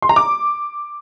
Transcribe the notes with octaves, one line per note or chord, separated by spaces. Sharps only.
C6
A#5
D6